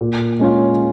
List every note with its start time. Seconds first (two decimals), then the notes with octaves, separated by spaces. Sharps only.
0.01 A#2
0.39 G#3 C#4 F4